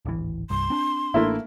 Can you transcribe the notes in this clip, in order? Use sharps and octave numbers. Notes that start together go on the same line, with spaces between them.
D1 G#1 E3
C2 G2 C6
C4 D4
A1 A3 A#3 C4 D4 E4